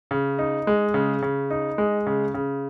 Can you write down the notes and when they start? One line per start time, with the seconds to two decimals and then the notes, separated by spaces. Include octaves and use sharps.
0.11 C#3
0.39 D#4
0.67 G#3
0.94 C#3
1.22 C#3
1.50 D#4
1.78 G#3
2.06 C#3
2.34 C#3